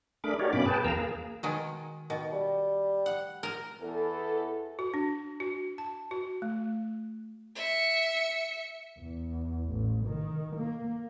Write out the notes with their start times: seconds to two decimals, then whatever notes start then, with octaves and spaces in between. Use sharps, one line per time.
0.24 A3 D4 G#4 A#4 B5 D6
0.39 D#4 F#4 G4 A#4 C#5 D5
0.53 G2 B2 A#3 C#4 B5 D6
0.66 G#4 B4 G5 A5
0.85 E2 A#4 F5 A#5 E6
0.98 A#3 G#4
1.43 B2 D#3 G#3
2.10 B2 D#3
2.33 G3
3.06 F#5
3.43 A#4
3.81 E2 A4
4.79 F#4
4.94 D4
5.40 F#4
5.78 A5
6.11 F#4
6.42 A3
7.55 E5 C#7
8.99 E2
9.70 A1
10.07 D#3
10.56 A#3